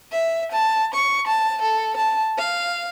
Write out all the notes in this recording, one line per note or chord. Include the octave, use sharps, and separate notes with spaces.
E5
A5
C#6
A5
A4
A5
F5